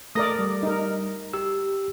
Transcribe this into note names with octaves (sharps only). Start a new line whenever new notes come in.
A3 A#4 D5 D#6 A#6
G3
D#4 A#4
G4 E6